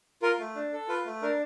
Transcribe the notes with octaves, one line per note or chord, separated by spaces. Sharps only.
F4 A#4
A3
D4
A4
F4 B4
A3
D4 A#4